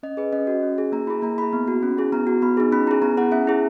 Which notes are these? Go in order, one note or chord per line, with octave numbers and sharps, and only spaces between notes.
C#4 D#5
G#4 B4
C#4 D#5
F#4
C#4
G#4
A#3 A#5
E4 G#4 B5
A#3 A#5
E4 G#4 B5
B3
F#4
C#4
E4 G#4
B3 A#5
F#4
B3 B5
D#4 G#4
C#4 B5
E4 G#4 A#5
B3 A#5
E4 G#4 F#5
C#4 E5
E4 G#4